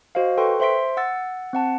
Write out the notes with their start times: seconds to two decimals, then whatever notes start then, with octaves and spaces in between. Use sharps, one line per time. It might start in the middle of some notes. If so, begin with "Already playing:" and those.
0.15 F#4 C5 D#5 F5
0.37 A4 B4 G5 C6 C#6
0.60 C5 E5 C6 B6 D7
0.97 F#5 E6 A6
1.53 C4 F#5 A5